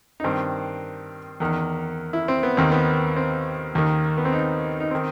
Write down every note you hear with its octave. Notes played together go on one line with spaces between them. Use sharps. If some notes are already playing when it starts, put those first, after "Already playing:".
D#4
G2 D#3 C4
E2 D#3
E4
C4
B3
D#2 D#3 C4
B3
C4
D#2 D#3
B3
C4
D#4
D#4
D#3 C4